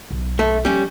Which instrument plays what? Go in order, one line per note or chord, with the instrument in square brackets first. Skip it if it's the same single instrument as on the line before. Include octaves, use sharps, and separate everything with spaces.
[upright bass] B1
[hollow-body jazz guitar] A3
[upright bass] F3 [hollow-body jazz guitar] G3 C#4